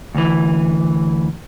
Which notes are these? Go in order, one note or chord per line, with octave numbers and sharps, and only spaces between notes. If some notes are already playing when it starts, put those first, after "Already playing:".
D2 E3